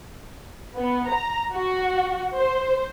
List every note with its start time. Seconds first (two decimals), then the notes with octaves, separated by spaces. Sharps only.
0.76 B3
1.09 A#5
1.55 F#4
2.37 C5